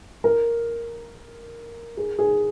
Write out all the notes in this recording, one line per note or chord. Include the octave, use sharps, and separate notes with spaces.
A#4
G#4
G#4